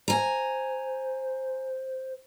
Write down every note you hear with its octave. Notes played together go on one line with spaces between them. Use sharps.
C5 G#5 A#5